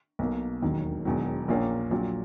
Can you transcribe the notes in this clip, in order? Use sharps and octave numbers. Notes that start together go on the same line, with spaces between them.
B1 B2 A#3
E1 D#2 D#3 F#3
E1 E2 D#3 F#3
A#1 A#2 A#3 C#4
A#1 A#2 F#3